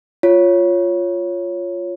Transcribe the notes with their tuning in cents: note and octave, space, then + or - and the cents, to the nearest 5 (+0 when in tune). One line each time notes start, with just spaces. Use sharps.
F4 +0 C#5 +0